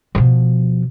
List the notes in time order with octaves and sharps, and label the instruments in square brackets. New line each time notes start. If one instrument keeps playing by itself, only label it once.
[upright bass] B2 F3